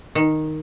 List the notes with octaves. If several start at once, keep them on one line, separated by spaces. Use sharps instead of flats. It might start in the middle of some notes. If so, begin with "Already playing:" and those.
D#3